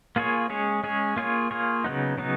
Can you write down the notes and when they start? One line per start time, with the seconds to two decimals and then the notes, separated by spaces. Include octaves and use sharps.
0.16 A#3 F4 G#4 C#5
0.50 G#3 C#4 G#4 C#5
0.84 G#3 C#4 G#4 C#5
1.17 A#3 F4 G#4 C#5
1.51 A#3 F4 G#4 C#5
1.84 C#3 F#3 B3 D#4
2.18 C#3 F#3 B3 D#4